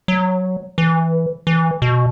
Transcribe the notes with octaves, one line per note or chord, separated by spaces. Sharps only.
F#3
E3
E3
B2